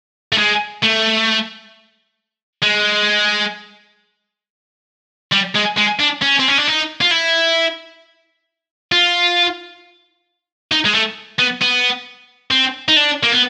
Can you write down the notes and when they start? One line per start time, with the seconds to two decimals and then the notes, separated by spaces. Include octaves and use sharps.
0.32 A3
0.38 G#3
0.82 A3
2.62 G#3
5.32 G3
5.55 G#3
5.77 G#3
6.00 D4
6.22 C#4
6.39 C4
6.48 C#4
6.58 D4
6.68 D#4
7.01 F4
7.11 E4
8.92 F4
10.72 D#4
10.85 G#3
10.95 A3
11.39 B3
11.61 B3
12.51 C4
12.88 D#4
12.97 D4
13.23 A#3
13.32 B3